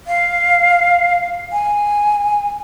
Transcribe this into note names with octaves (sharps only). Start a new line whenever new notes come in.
F5
G#5